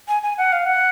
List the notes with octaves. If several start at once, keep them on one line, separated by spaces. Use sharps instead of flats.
G#5
G#5
F#5
F5
F#5